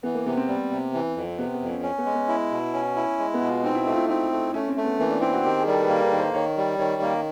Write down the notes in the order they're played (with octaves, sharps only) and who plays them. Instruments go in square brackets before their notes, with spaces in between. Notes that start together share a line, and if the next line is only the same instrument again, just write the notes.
[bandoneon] E3 [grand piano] B3
[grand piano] A#3
[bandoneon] C3 [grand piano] B3
[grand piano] C4
[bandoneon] G3
C3
E3
F2
[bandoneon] C3 [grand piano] B3
[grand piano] B3
[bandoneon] F2
[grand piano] C#4
[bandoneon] C#4
[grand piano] B3
[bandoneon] G#3
[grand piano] B3
[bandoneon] E4
B2
C#4
E4
G#3
[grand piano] B3
[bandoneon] B2
[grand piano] F4
[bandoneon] C4 [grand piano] D#4
[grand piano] E4
[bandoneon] A3 [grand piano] D#4
[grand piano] F4
E4
[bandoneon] C4 [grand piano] D#4
[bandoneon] A3
[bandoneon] A3 [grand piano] C#4
[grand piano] C4
[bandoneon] A3
[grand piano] B3
[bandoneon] E3 [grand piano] A#3
[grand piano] D4
[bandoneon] C4 [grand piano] E4
[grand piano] F#4
[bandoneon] D#3 [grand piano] G4
[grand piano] G#4
[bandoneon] G3 [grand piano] A#4
[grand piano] A4
B4
[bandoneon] A#3 [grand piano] A#4
[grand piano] B4
[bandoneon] D#3
[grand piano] C5
[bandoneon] D#3 [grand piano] C#5
[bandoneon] G3
[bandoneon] D#3 [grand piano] C#5
[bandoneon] A#3